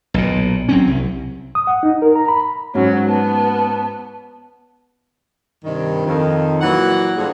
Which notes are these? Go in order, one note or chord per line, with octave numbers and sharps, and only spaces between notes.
B1 A#2
F#3 C4 C#4
C2
D#6
F#5
D#4
A#4
A#5
B5
G#2 F#3 C#4 F#4 C#5
B3 A5
G2 C3 D#3
F2 D#3
A#2 E3 F#3 F#4 F#5
G2 A#2 D3 F3 G3 G#4